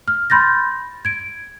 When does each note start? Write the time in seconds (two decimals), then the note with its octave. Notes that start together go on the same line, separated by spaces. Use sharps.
0.08 F6
0.30 B5 C6 G6 A6 A#6
1.05 G#6 D7